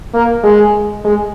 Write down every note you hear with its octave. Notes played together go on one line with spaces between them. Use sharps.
A#3
G#3
G#3